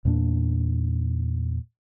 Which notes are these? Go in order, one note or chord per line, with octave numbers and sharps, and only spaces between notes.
E2 A#2 A#3 D4